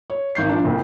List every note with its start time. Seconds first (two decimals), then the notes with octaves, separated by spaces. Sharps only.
0.10 C#5
0.35 G#1 G6 C7
0.49 F3 D4
0.64 F#1 C2 F2